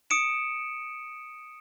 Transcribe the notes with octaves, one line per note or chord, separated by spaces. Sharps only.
D#6 C#7 D7 E7